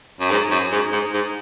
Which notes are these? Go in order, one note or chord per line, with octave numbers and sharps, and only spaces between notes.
F#2
G#2
F#2
G#2
G#2
G#2